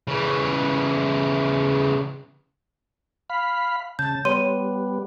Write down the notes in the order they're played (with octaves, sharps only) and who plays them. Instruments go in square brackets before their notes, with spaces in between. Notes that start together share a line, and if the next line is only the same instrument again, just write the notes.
[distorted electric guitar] C#3 E3
[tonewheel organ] F5 B5
[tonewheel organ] C#3 A5 [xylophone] G6
[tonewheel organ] G3 B3 [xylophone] C#5 C6 D#7